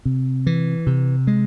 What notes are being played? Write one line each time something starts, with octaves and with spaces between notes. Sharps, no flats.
C3
E3
C3
G#3